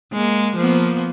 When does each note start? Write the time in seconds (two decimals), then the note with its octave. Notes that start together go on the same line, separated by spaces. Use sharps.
0.13 G#3 A#3
0.56 F3 A#3 B3